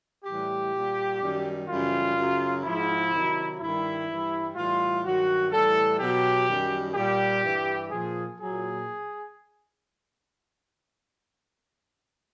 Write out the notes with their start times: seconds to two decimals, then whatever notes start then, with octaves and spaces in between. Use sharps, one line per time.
0.25 A2 E3 G3 G4
0.73 A#2 G3
1.21 F#2 D#3 G3
1.69 F#2 C#3 E3 G3 F4
2.17 F#2 C#3 F#3
2.64 G#2 F3 E4
3.12 C3 D#3 F#3
3.60 G2 D#3 G3 E4
4.09 G2 E3 G3
4.55 A2 E3 G3 F4
5.04 G2 D#3 F#3 F#4
5.51 A2 E3 G3 A4
6.00 B2 F#3 G4
6.48 F#2 D#3 G3
6.95 A#2 G3 G4
7.43 G2 E3 G3
7.91 A#2 F3 G#4
8.38 A#2 F#3 G#4